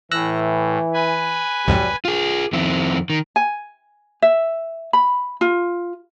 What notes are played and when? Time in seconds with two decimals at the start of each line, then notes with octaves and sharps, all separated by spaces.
0.11 A2 E3 E6 F#6 A#6
0.94 B4 G#5
1.67 C2 F2 G#2 F#3 G3
2.05 F4 G#4
2.53 F2 D#3 C4 E4
3.10 D#3
3.36 G#5
4.22 E5
4.93 B5
5.41 F4